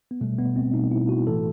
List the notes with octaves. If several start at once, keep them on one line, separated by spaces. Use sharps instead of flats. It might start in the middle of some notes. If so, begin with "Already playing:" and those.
B3
B2 G3 A3
B3
C4
B2 G3 D#4
E4
F#4
A2 E3 A3 A4